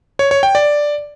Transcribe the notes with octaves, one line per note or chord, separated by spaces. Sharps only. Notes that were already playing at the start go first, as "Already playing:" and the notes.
C#5
C#5
G5
D5